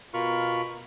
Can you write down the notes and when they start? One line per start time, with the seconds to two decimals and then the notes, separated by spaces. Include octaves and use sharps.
0.14 B2 F4 A#4 B5 C#6 F6